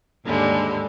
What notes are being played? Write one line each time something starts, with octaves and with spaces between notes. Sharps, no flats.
D#2 G#2 D3 G3 G#3